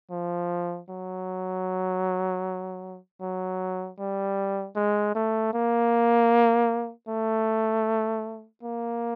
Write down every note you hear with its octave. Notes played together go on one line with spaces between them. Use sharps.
F3
F#3
F#3
G3
G#3
A3
A#3
A3
A#3